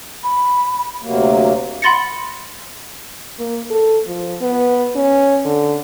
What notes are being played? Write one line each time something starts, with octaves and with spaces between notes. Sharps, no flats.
B5
D2 C3 F#3 A#3
F#5 B5 C6 A6 A#6 C#7
A#3
A4
F3
B3
C#4
D3